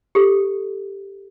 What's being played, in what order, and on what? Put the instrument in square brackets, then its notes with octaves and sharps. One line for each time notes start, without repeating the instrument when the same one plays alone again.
[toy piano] G4 A4